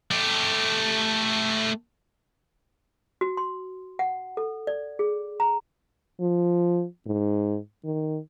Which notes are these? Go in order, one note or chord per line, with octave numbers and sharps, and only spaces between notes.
A3 G4
F#4
C6
F#5
A4
D5
G#4
A#5
F3
G#2
D#3